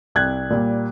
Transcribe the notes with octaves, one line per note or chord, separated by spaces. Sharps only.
C2 F#6 G#6
A#2 G3